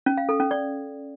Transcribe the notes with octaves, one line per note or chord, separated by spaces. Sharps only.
C#4
F5
A4
C#4
D5